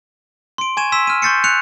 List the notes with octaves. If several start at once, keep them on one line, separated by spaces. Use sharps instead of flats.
C6 D7
G#5 C#6 G#6 D#7 E7
C6 E6 B6 E7
F6 D#7
C6 C#6 G6 A6 C7 C#7
F#6 C#7 F7